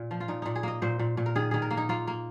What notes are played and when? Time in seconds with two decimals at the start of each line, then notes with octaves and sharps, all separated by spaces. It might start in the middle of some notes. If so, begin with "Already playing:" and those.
Already playing: A#2
0.11 F3
0.20 F4
0.28 A#2 D#4
0.42 A#2 D#4
0.55 G#4
0.63 A#3 D#5
0.82 A#2 C5
0.99 A#2
1.17 A#2
1.26 A#4
1.36 D#3 G#4
1.51 D#3 G#4
1.62 A#4
1.71 A#3
1.77 D#4
1.89 A#3 F4
2.07 A#3